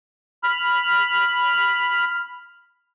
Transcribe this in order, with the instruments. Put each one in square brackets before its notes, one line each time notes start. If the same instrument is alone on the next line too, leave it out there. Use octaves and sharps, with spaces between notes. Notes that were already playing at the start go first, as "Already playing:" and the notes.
[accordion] B5 F6